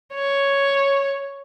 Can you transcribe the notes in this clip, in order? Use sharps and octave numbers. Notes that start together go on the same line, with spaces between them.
C#5